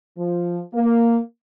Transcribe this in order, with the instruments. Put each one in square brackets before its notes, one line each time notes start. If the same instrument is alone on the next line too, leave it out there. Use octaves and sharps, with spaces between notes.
[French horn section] F3
A#3